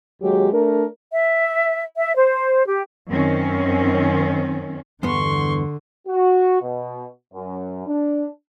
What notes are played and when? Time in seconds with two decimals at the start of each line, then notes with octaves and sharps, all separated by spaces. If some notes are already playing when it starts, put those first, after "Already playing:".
0.21 D#2 F#3 G#3 G4
0.52 A3 D4 A#4
1.12 E5
1.98 E5
2.15 C5
2.67 G4
3.09 F#2 D#3 C4 C#4
5.03 E2 G2 D3 B3 C6 C#6
6.07 F#4
6.61 B2
7.33 F#2
7.86 D4